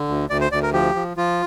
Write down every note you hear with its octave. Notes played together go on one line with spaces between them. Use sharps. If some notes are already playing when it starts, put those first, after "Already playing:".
Already playing: D3
D2
D2 D5
C5
D2 D5
A#4
F3 G4
F3
F3 F4